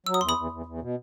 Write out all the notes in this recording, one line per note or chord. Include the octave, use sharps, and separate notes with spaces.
F#3 E6
D#6
E2 C6
B5 D#6
E2
E2
E2
B2